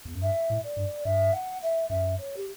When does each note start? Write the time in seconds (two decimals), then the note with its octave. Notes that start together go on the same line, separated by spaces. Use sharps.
0.05 E2
0.14 F#2
0.22 G2 E5
0.50 A2
0.64 D5
0.77 G2
1.05 G2 E5
1.33 F#5
1.62 E5
1.89 F#2 E5
2.18 C#5
2.36 G4